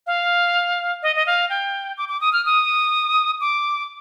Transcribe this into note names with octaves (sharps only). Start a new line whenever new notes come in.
F5
D#5
D#5
F5
G5
D6
D6
D#6
F6
D#6
D6